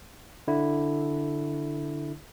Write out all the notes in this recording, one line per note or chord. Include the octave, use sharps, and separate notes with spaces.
D3 E4